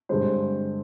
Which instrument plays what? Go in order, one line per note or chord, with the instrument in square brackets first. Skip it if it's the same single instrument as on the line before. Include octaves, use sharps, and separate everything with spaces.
[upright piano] G2 D3 G#3 C5